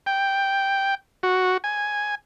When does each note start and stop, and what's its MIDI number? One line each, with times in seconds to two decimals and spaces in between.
0.06 0.95 79
1.23 1.57 66
1.64 2.15 80